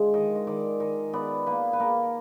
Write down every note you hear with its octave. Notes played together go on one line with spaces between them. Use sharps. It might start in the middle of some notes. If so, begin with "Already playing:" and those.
Already playing: D3 G#3 F4
D#3 D#5
D#5
D#3 D5
D#3 D#5
B3 D5
A#3 B4
B4
A#3 A#4